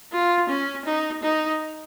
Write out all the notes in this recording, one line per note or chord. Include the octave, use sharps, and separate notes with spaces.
F4
C#4
D#4
D#4